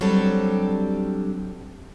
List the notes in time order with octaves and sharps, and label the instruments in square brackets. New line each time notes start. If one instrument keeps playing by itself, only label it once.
[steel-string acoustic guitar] F#3 G3 C4 D4 G4 A4